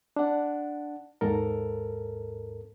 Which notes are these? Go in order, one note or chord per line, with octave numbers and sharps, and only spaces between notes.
D4 F#5
D#2 G#2 A4 A#4